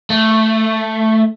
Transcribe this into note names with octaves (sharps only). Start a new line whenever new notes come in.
A3